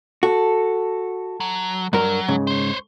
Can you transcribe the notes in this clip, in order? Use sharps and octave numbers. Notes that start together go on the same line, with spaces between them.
F#4 A4
F#3
G2 F#3 A#4
G#2 C#3
C5 C#5